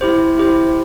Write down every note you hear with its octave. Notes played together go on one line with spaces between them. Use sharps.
E4 G4 C5
E4 G4 C5